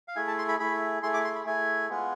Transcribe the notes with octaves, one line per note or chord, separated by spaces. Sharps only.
F5
A3 E4 G#4 G#5
A5
C6
B5
A3 E4 G#4 B5
A3 E4 G#4 C6
D6
C6
B5
A3 E4 G#4 G#5
G#3 B3 F4 G#4